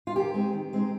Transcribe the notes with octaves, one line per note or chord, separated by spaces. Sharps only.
F4
D#3 G4
G#3 C4 D#4
D#3
G#3 C4 D#4